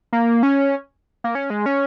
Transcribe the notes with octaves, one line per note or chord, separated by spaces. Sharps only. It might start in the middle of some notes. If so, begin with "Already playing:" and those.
A#3
C#4
A#3
C#4
G#3
C#4